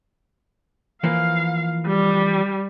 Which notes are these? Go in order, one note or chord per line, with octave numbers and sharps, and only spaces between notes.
E3 F3 A#3 F5
G3